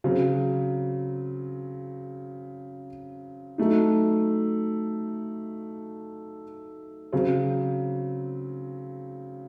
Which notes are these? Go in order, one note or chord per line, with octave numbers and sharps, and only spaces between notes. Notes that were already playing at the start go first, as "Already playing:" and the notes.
C#3 F#3 C4
F#3 A3 D#4
C#3 F#3 C4